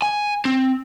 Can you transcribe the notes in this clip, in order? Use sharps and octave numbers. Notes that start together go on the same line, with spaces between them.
G#5
C4